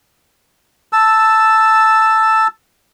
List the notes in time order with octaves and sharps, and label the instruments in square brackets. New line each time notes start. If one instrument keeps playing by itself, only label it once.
[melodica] A5 E6